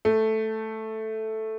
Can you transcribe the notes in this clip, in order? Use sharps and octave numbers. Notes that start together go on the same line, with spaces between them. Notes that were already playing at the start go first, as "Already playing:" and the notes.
A3